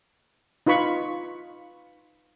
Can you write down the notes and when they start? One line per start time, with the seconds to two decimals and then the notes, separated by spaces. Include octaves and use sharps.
0.67 D#4 F4 B4 B5 C#6